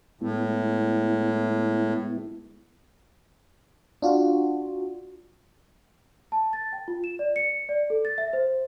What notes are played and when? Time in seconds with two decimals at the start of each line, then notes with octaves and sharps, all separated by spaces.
0.21 A2 G#3 B3 E4
4.02 D4 F4 F#4
6.32 A5
6.53 A6
6.73 G5
6.88 F4
7.04 E7
7.19 D5
7.36 C#7
7.69 D5
7.90 A4
8.05 A6
8.18 E5
8.33 C5